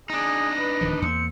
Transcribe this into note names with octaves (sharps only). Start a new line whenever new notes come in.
D4 D#4 G#4 A#6
B4
D1 D#3 F3
E2 A#3 C4 C#7